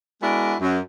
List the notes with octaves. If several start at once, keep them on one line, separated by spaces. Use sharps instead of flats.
G#3 B3 D4 E4 F#4 A#4
F#2